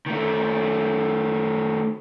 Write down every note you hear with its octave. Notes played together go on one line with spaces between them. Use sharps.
D#3 A3